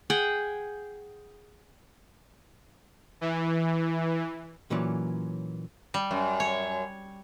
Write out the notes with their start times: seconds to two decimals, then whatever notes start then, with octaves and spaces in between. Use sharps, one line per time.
0.10 G#4 F#5 G5
3.21 E3
4.70 A#2 E3 F#3 C#4 D5
5.94 G3
6.11 F#2
6.40 C#5